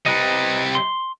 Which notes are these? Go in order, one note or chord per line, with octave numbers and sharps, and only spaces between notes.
C3 G3 B4 D#5
C6